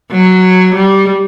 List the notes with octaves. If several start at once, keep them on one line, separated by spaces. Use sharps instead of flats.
F#3
G3